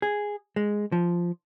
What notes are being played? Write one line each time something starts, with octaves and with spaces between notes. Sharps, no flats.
G#4
G#3
F3